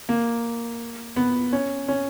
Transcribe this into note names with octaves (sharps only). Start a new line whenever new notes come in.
A#3
B3
C#4
C#4